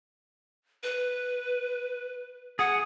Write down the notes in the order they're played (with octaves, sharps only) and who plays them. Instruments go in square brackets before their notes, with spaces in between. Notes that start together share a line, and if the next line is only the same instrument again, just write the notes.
[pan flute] B4
[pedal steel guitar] G#4 [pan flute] F#5